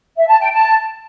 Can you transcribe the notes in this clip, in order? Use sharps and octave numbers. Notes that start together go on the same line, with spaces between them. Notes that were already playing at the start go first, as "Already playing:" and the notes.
E5
A5
G5
A5